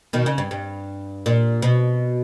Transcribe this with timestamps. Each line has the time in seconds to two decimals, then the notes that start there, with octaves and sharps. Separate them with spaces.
0.13 B2 D#3
0.26 C#3
0.38 G2
0.51 G2
1.26 A#2
1.62 B2